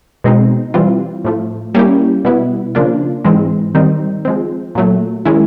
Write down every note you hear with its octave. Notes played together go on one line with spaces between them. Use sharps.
B2 G#3 C4 D#4
E3 G3 C4 F4
A2 F3 A3
G3 A#3 C#4 E4 G4
B2 G3 B3 E4
C#3 F3 A#3 D4 F4
G#2 E3 G#3 C4
D#3 G3 C4 D#4
F3 G#3 C4
A#2 F#3 A3
D#3 G#3 C#4 E4